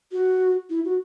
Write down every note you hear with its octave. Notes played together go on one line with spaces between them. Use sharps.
F#4
E4
F#4